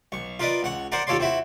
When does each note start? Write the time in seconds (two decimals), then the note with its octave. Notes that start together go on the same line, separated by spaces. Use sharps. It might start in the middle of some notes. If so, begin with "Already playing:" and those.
0.12 B1 C#6
0.39 F4 A#4 B4 D5 D#5
0.63 C#2 F#5 C#6
0.92 A#4 C5 D5 F#5 A#5
1.07 D#2 F4 A4 C#5 D5 C6
1.20 C4 E4 F#4